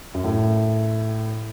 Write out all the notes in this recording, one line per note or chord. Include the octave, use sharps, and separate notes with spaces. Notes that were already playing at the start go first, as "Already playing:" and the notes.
F#2
A2